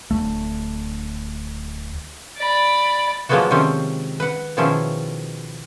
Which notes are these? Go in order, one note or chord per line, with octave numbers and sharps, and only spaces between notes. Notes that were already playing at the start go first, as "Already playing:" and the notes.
D1 G#1 D2 A3
D5 B5
F3 F#3 G#3 A#3 B3 F#4
C3 D#3 F3 C4 C#4
B4 F#5
B2 D#3 F3 C#4 E4 G#4